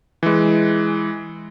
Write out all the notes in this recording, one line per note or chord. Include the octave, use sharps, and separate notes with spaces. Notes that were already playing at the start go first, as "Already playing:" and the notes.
E3 G#3